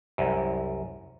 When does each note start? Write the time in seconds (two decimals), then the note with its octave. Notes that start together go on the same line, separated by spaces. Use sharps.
0.18 C2 F#2